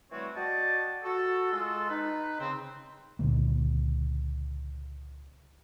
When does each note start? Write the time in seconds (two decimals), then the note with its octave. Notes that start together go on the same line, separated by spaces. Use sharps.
0.11 E3 G3 A3 C4 F#4 C#5
0.36 F#4 D5 D#5 G5 A5
1.04 F#4 A4
1.52 G#3 F4 A4
1.89 D#4 B4
2.40 C#3 C4
3.19 C#2 A#2 D3 A#3